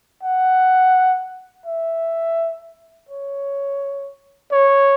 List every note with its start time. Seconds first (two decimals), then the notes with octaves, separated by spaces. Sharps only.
0.23 F#5
1.66 E5
3.09 C#5
4.52 C#5